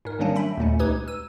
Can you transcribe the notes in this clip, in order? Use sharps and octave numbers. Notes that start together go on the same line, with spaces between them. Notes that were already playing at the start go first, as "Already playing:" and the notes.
G#2 A#4
D#3 F#3 G3 A#3 C#4 D4
E5 G5 B5
D#2 A#2 A3 C#4
C#2 D#4 G4 B4 D#6 G#6
E6 D#7